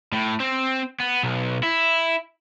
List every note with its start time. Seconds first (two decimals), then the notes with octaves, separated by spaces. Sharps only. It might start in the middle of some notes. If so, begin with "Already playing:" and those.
0.13 A2
0.40 C4
1.00 B3
1.23 B1
1.63 E4